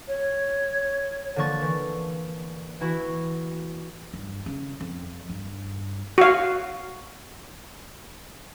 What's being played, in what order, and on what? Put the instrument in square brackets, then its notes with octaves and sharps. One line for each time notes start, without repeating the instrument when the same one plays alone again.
[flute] C#5
[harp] D3 F3 A#3 C#6 A6
E3
E3 E4 F#4
[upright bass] G2
C#3
F2
G2
[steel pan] F#4 F5